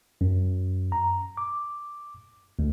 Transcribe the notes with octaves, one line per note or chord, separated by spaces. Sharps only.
F#2
A#5
D6
D2